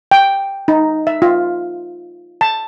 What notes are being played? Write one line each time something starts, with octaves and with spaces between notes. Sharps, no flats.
G5
D#4
E5
F4
A5